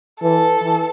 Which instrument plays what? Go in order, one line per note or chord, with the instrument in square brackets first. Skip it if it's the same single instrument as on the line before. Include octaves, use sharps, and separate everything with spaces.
[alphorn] E3 [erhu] A4
[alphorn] E3